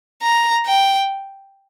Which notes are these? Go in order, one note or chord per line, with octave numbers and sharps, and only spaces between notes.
A#5
G5